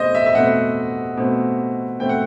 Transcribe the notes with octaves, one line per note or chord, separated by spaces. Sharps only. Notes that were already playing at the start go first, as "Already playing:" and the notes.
Already playing: B2 A3 C4 C5 D#5
E5
E5
B2 A3 C4 F#5
B2 A3 C4
B2 A3 C4 G5
F#5